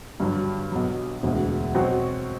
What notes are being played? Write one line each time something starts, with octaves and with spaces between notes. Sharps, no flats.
G2 D3 F#3
B1 B2 F#3
E1 D2 D3
B2 F#3 C4 F#4